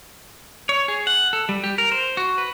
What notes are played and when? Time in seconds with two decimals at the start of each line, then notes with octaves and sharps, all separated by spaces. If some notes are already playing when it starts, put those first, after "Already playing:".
0.69 C#5
0.88 G#4
1.07 F#5
1.33 A4
1.49 G3
1.64 G4
1.78 A#4
1.92 C5
2.17 F#4
2.38 B4